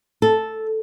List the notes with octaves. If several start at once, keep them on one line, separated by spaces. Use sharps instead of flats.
A4